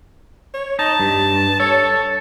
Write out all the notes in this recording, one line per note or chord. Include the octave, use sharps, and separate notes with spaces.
C#5
D#4 A5
G2
A4 C#5